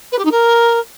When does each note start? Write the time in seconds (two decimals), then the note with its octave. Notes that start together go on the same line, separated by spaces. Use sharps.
0.11 B4
0.18 G4
0.24 D#4
0.31 A#4